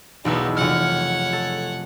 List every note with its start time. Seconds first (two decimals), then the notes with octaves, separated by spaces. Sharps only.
0.25 E1 B1 B3 D#4 E6
0.57 F1 C#5 F#5 F6
1.33 A4